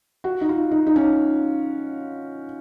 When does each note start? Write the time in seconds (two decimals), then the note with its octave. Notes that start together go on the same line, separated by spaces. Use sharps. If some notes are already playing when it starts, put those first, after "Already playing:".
0.24 F#4
0.41 D#4
0.49 F4
0.71 D#4
0.87 D#4
0.96 C#4